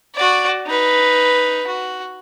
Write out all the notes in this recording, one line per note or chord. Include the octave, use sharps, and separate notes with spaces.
F#4 D5
D#4 B4
F#4